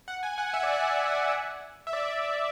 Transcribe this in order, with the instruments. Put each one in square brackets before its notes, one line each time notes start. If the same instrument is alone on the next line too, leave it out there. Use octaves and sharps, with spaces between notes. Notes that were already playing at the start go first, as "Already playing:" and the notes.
[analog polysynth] F#5
G#5
F#5
E5
D5
E5
E5
D5